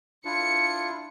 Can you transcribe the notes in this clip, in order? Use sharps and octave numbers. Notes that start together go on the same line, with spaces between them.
D4 E4 F4 C#7